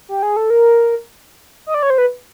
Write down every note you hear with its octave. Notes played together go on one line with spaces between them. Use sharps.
G4
G#4
A4
A#4
D#5
D5
C#5
C5
B4